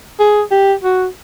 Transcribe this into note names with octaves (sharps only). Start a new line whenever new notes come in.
G#4
G4
F#4